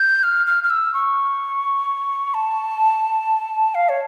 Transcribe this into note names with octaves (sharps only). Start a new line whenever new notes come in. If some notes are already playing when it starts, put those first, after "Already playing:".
Already playing: G6
F6
F6
F6
E6
C#6
A5
F5
C#5